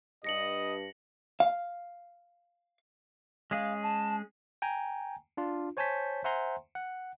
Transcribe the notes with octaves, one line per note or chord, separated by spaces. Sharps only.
G2 D#5 A#6 C#7 F#7
F5
G#3 C#4 G#4 F5
A5
G5 G#5 A#5
D4 F4
C5 C#5 G#5 A5 G6 B6
C5 E5 F#5 G#5 A#5 C6
F#5